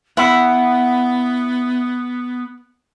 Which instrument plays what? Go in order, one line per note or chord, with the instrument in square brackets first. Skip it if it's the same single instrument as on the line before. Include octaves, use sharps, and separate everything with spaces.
[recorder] B3 [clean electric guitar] E4 [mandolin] F#5